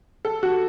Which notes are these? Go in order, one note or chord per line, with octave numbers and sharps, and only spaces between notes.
A4
F#4